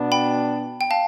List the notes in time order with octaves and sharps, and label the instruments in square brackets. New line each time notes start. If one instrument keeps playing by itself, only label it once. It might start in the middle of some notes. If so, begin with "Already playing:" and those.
Already playing: [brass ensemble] B2 B3 D4
[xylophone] G5 B5
G5
F5 A5